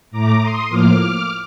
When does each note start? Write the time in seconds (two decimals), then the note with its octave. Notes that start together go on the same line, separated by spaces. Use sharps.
0.11 A2 A3 A#5 D6
0.40 C6 D#6
0.69 A2 F3 A#3 D6 F6